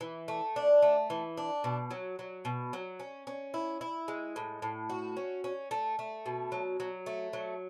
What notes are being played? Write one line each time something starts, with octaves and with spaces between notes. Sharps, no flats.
E3
A3
D4
A3
E3
D4
B2
F#3
F#3
B2
F#3
C#4
C#4
E4
E4
G#3
A2
A2
F#4
C#4
C#4
A3
A3
B2
F#3
F#3
A3
F#3